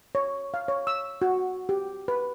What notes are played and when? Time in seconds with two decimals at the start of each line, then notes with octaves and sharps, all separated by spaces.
0.15 C#5
0.54 F5
0.68 C#5
0.87 E6
1.22 F#4
1.69 G4
2.08 B4